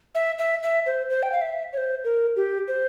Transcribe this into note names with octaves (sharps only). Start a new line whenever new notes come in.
E5
E5
E5
C5
C5
G5
F5
E5
C#5
C5
A#4
G4
C5